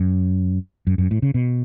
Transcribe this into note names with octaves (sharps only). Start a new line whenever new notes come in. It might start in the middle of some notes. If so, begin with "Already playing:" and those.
Already playing: F#2
F#2
F#2
A2
C#3
B2